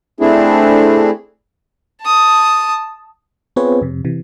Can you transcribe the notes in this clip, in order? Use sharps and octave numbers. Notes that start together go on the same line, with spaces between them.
A3 C4 D4 E4 G#4
A5 D#6
B3 C4 F4 G#4 B4 C#5
F2 C3
C3 E3